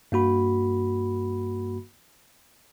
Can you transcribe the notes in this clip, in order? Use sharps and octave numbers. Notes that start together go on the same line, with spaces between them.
G2 A#3 F#4 B5